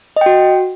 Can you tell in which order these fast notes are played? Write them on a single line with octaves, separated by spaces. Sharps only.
D#5 G5 F#4